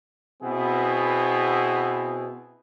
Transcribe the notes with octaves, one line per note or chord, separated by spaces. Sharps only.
B2 B3 C4 E4 G#4